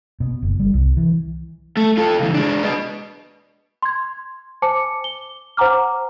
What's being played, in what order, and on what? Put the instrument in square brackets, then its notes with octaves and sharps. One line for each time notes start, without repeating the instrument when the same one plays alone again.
[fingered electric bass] B2
F#1
G3
C2
E3
[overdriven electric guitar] A3
F4 A4
C#2 E3
G#3 D4
B4 D#5
[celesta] C6 G#6
C5 G#5 A5 D6 C#7
G7
C5 F#5 G#5 A#5 D6 F6